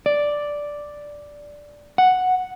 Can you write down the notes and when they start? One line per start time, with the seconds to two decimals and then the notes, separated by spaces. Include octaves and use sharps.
0.06 D5
1.98 F#5